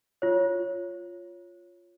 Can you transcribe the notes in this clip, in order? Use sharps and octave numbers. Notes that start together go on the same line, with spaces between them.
F4 C#5